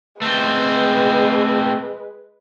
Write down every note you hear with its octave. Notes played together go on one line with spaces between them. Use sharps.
G#3 A3 C4 B4